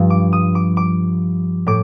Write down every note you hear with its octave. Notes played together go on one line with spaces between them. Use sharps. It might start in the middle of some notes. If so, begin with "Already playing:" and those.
Already playing: G2 F3
D6
D#6
D6
D6
A2 D6